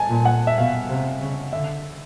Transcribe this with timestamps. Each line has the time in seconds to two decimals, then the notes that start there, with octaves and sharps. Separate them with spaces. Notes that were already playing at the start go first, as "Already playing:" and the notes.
Already playing: G#5 A5
0.09 A#2
0.25 F#5
0.47 E5
0.58 B2 F5
0.89 C3
1.20 C#3
1.51 D3 E5